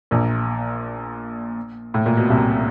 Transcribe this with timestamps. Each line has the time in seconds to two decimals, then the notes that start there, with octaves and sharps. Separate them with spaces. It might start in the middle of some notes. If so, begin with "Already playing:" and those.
0.11 A#1 A#2
1.94 A2
2.06 A#2
2.17 B2
2.30 C2 C3